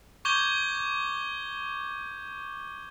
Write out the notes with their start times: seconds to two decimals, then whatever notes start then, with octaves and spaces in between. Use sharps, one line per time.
0.25 C#6 D6 G6 G#6 G7